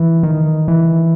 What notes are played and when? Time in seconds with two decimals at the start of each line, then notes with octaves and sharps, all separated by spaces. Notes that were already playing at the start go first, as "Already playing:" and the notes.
Already playing: E3
0.23 D#3
0.68 E3